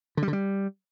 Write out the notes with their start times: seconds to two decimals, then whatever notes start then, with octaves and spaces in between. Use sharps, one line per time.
0.17 D3
0.23 G3
0.28 D3
0.33 G3